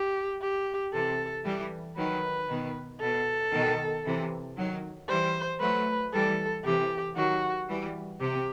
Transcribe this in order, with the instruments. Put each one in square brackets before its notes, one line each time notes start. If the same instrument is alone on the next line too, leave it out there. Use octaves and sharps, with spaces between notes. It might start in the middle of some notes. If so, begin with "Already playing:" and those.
Already playing: [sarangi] G4
G4
[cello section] C3 E3 [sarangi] A4
[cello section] E3 G3
[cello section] D#3 F#3 [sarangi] B4
[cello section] B2 D#3
[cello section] B2 [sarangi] A4
[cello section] B2 D#3
C3 E3
D#3 F#3
[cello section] E3 G3 [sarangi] C5
[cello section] F#3 A3 [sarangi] B4
[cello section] E3 G3 [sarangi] A4
[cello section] C3 E3 [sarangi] G4
[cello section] D#3 F#3 [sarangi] F#4
[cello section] E3 G3
[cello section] C3 [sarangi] G4